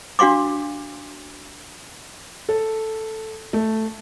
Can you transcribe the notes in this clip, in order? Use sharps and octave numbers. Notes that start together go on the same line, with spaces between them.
D4 F#4 F5 C6 D6
A4
A3